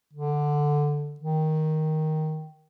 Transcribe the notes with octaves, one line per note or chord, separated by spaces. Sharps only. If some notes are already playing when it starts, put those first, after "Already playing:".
D3
D#3